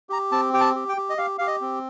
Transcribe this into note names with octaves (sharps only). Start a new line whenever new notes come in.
G4 A#5
C4 A5
G4 G5
A5
G4
G5
G4
D#5
G4 F5
G4 F5
D#5
C4